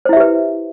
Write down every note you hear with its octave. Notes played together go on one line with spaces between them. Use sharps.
E4 G4 B4 C5 E5